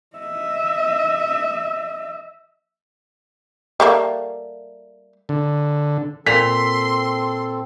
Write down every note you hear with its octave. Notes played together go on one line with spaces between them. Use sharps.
D#5 E5
G3 A3 A#3
D3
A#2 C4 A4 A#5 C6 B6